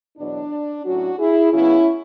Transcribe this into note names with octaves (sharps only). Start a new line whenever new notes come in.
E2 B2 F#3 D4
A2 F#3 C#4 D4 F#4
E4 G#4
C#3 F#3 B3 C#4 E4